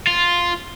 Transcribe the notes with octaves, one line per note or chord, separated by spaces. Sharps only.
F4